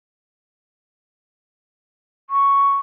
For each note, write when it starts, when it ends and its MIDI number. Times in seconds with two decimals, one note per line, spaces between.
2.30 2.74 85